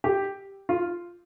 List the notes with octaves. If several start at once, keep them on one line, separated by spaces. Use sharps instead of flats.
G4
F4